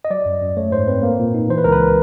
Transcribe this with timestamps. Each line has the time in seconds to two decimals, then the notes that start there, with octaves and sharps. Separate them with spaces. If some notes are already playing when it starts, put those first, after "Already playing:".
0.05 D#5
0.10 F#3 D5
0.25 F#2
0.42 F#2
0.57 A3 C#5
0.72 G#2 C5
0.88 C4 B4
1.03 A#3
1.20 A#2
1.34 D#4
1.49 E3 C5
1.58 B4
1.64 C#2 A#4
1.72 B4